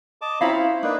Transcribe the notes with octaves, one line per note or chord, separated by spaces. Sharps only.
D#5 A5 D6
C4 C#4 E4 F5 A#5 B5
C5
A#3 D4 D#4 B4